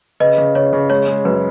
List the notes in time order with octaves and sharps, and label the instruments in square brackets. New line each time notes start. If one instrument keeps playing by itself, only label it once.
[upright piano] C#3 [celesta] B4 D#5
[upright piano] C#3
[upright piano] C#3 [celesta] C#5
[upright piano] C#3
[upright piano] G#3 [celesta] C#5
[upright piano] G#3
[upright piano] F#2 [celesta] B4